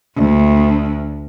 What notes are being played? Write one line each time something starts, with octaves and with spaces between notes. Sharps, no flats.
D2